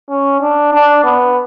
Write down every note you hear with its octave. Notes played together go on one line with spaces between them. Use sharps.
C#4
D4
D4
B3